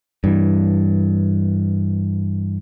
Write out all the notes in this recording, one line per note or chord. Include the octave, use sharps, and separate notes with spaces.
G2 E3